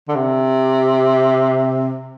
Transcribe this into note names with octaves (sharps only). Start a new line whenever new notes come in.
D3
C3